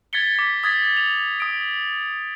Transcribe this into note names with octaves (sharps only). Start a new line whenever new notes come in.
G#6 A6 B6 C#7 G7
D6 B6
D#6 G#6 A6 B6
A6
F7
D#6 D7